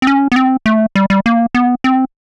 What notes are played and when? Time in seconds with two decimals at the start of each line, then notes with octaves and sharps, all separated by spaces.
0.02 C4
0.07 C#4
0.32 B3
0.36 C4
0.66 A3
0.96 G3
1.10 G3
1.26 A#3
1.55 B3
1.84 C4